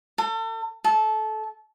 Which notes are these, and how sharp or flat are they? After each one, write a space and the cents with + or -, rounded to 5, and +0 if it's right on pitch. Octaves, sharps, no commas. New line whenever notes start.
A4 +35
A4 -20